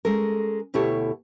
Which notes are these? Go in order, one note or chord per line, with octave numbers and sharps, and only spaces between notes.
G#3 C#4 A4 A#4
D2 B2 E4 G4 A4 C#5